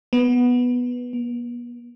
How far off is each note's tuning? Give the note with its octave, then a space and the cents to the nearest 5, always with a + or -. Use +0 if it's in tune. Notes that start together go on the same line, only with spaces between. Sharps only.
B3 -5
B3 -45